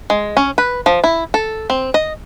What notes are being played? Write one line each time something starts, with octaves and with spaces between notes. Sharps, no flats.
G#3
C#4
B4
F3
E4
A4
C4
D#5